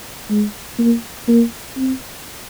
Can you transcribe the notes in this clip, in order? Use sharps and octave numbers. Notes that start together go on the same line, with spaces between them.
G#3
A#3
A#3
C4